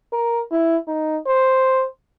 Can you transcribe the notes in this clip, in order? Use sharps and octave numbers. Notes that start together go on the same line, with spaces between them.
A#4
E4
D#4
C5